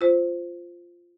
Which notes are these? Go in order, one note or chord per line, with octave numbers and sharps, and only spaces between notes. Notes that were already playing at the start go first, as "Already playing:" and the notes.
F4 C5